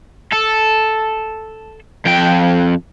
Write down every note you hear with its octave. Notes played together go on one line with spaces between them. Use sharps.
A4
F2 G5